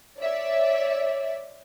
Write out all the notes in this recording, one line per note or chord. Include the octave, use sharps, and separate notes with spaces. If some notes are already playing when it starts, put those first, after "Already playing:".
C#5 D5 E5